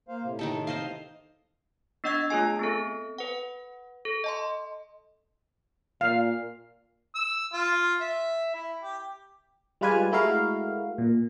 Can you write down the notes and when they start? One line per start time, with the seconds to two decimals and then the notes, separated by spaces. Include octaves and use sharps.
0.08 A#3 C5 F5
0.23 A2 C3
0.39 D#3 D#4 A4
0.67 C5 D#5 F5
2.04 B3 D4 D#5 F#5 E6 G#6
2.30 A3 F4 G#4 G#5
2.59 B3 C4 A4
3.18 B4 F#5
4.05 A4
4.24 D#5 A5 C6
6.01 A#2 F5
7.15 E6
7.53 F4
8.01 E5
8.54 E4
8.82 G4
9.81 G3 G#3 F4 B4 D5 G#5
10.12 G#3 A3 E4 F#4 A#4 F5
10.98 A#2